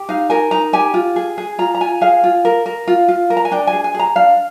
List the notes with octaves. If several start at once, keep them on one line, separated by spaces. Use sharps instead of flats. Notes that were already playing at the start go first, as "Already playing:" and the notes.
Already playing: G4
D#4 F5
A#4 G#5
D#4 A#5
G4 G#5
F4
G#4
G#4
F4 A#5
A#5
F4 G#5
G#4 F5
F4
A#4
A#4
F4
F4
A#4
A#5
G#5
D4 G5
G#5
G#4
G#5
G#4
A#5
D4 F5